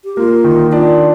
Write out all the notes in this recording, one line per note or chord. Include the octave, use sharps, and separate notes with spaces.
G4
A#3 F4
D#3
D4 F4